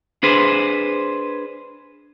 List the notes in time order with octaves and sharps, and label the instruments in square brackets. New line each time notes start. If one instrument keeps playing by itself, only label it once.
[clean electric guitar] D4 G#4 B4 C5